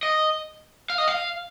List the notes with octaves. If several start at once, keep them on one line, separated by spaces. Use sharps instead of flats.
D#5
F5
D#5
F5